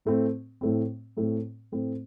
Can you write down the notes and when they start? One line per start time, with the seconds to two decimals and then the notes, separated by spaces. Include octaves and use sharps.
0.05 A2 A3 C4
0.61 A2 A3 C4
1.17 A2 A3 C4
1.72 A2 A3 C4